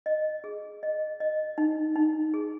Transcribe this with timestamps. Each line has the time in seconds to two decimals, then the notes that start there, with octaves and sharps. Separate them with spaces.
0.06 D#5
0.44 G#4
0.83 D#5
1.20 D#5
1.58 D#4
1.96 D#4
2.34 G#4